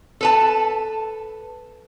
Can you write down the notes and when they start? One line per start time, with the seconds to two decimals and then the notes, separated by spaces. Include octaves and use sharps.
0.21 A4 B4 A5